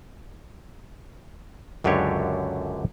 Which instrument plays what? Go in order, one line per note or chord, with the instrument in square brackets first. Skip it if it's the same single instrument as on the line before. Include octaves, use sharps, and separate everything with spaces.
[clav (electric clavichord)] C#2 F#2 D3 D4 G4 C#5